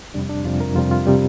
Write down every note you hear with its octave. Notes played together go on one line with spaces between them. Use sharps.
F2 C3 G3 D4
D4
F2 C3 G3 F4
A#4
F2 C3 G3 F4
F4
C3 G3